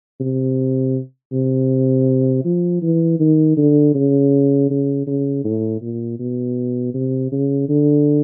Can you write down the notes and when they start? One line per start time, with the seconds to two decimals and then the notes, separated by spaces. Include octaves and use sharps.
0.21 C3
1.33 C3
2.45 F3
2.82 E3
3.20 D#3
3.57 D3
3.95 C#3
4.70 C#3
5.07 C#3
5.45 A2
5.82 A#2
6.20 B2
6.94 C3
7.32 C#3
7.69 D3